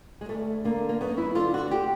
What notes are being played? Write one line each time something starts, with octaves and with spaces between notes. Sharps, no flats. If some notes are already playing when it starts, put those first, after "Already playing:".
G#3
D2 A3
D3 A#3
A#3
F#2 B3
E4
D3 F4
F#4
G4